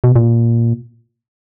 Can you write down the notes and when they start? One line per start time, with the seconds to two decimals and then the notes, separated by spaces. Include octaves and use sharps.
0.04 B2
0.16 A#2